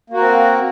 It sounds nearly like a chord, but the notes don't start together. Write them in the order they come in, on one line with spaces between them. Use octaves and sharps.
A#3 F#4 A#4 C4